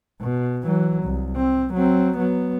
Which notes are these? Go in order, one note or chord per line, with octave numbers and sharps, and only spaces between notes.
B2
E3 F#3
C2
C4
F#3 C4
F#3 B3